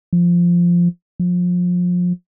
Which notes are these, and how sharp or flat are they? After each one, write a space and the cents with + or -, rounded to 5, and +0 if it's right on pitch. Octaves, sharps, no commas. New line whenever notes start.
F3 -5
F3 +30